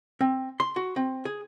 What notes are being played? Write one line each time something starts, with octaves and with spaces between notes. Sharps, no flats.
C4
C6
F#4
C4
G#4